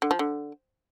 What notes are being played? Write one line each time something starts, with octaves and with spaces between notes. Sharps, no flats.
D3
F3
D3